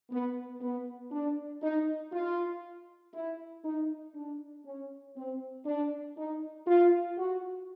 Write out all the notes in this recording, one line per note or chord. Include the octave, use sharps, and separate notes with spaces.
B3
B3
D4
D#4
F4
E4
D#4
D4
C#4
C4
D4
D#4
F4
F#4